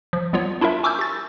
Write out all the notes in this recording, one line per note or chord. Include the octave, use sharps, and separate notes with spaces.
F3
G3 B3 F4 C#5
D4 E4 F4 A#4 E5
G#5 C#6 D6 E6 F6 G6
G4 A6